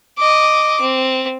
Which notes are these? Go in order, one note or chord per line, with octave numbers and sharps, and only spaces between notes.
D#5 D6
C4